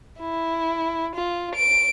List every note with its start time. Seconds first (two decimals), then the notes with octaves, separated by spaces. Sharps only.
0.19 E4
1.15 F4
1.55 D7